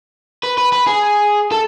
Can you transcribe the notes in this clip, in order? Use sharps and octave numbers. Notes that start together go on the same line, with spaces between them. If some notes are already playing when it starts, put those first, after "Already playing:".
B4
B4
B4
G#4
A4